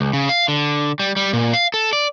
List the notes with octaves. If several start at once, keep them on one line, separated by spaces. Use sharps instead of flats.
C#2
C#3
F5
D3
G3
G3
A#2
F5
A4
D5